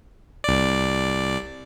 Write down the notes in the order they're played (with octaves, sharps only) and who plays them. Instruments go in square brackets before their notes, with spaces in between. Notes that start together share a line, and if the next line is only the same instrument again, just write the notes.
[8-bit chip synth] C2 D5